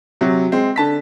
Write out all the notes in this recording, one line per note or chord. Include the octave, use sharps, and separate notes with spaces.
C3 F#3
G#3 C4
D3 A5 B6